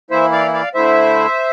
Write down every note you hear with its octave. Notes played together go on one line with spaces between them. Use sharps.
E3 A#3 E4 C5 E5
D5 F5
D5 F5
D3 A3 E4 C5 E5